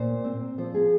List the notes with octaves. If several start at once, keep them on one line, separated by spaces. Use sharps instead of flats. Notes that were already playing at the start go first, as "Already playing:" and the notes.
Already playing: A#2 C5
C4
F3 C5
G#4